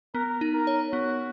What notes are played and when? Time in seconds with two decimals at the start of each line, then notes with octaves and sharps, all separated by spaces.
0.15 B3 A#4
0.41 D#4
0.54 A#4
0.67 C#5
0.93 B3 F#4